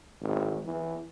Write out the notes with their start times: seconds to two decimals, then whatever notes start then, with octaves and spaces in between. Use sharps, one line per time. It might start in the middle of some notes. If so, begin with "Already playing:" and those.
0.21 G#1
0.65 E3